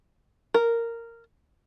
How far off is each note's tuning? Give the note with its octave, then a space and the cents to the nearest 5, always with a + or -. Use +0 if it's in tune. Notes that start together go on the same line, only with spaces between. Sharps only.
A#4 -10